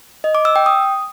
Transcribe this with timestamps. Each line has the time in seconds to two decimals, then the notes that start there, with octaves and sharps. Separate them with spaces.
0.24 D#5
0.35 D6
0.45 E6
0.56 G5
0.66 D#6